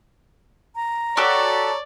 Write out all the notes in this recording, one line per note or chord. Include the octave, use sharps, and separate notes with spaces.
A#5
F#4 G4 A4 C#5 D5